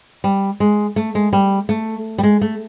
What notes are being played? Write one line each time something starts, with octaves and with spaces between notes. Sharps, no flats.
G3
G#3
A3
G#3
G3
A3
G3
G#3
A3